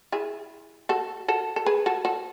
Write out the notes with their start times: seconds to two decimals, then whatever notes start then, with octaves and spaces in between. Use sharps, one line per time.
0.12 E4 G#4
0.89 F#4 A4
1.28 F#4 A4
1.56 A4
1.66 G#4 B4
1.86 F#4 A4
2.05 F#4 A4